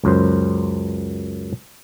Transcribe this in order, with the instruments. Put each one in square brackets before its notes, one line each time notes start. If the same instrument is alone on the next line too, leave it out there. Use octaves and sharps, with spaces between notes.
[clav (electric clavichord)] C#2 F#2 C5